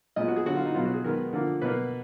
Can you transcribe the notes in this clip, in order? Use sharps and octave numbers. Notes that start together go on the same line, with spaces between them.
A#2 G#3 B3 D#5
F#4
G#4
D3 F#3 B3 F#4
F4
D#4
B2 F#3 B3 F4
F#4
G#4
D#3 G#3 B3 A#4
D3 F3 A#3
B2 A#3 B4